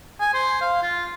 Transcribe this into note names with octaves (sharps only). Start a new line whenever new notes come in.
G#5
C5
F5
F4